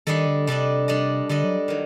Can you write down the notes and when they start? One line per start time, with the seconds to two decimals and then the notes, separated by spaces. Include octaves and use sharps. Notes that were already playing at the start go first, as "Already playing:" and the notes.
0.07 D#3 G3 D4 A4 D#5
0.27 D3
0.47 C3 G3 D4 A4 D#5
0.88 G3 D4 A4 D#5
1.29 D3 G3 D4 A4 D#5
1.44 F#3
1.68 D#3 F#3